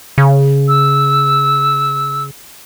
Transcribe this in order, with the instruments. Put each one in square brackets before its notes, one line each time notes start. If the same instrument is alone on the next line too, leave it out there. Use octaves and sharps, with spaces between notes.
[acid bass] C#3
[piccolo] E6